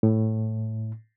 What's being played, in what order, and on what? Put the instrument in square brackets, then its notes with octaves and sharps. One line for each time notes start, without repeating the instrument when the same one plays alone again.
[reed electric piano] A2